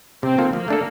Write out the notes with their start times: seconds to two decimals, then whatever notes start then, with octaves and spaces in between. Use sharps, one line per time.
0.23 C3 C4
0.38 D#3 A#3 F4 A4
0.53 F3 A#3
0.68 A3 D4 A4